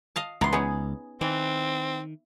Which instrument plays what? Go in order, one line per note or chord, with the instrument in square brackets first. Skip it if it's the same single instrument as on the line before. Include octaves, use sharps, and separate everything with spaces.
[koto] D#5 F5 A5
[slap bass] C#2 [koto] E3 B3 [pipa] A#5 C6
[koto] B3 D#4 [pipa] C#4 G#4
[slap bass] D#3 [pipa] E3 [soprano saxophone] C4